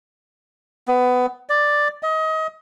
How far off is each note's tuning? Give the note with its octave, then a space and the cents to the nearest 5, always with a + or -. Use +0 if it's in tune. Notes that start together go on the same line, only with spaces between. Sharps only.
B3 +20
D5 +5
D#5 +30